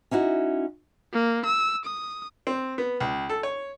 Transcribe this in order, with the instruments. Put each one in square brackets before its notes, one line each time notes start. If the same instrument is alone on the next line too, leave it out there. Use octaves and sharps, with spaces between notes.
[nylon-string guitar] C#4 D#4 E4 F#4
[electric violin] A#3
E6
D#6
[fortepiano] C4
B3
C#2
A4
C#5